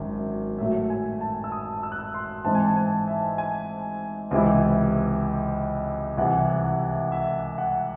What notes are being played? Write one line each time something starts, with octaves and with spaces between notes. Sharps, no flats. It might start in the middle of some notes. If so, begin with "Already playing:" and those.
Already playing: G#1 F#2
A2 F#3 A3 E5
G#5
A5
E6
D#6
E6
F#6
E6
C6
G#2 E3 C4 A5
G#5
A5
G#5
E5
G#5
C#2 C3 E3 C4 E4
C2 C3 E3 F#5
E5
E5
F#5